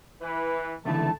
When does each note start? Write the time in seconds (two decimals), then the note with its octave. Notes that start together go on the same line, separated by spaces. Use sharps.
0.21 E3 B4
0.85 C#2 D3 E3 A3 A5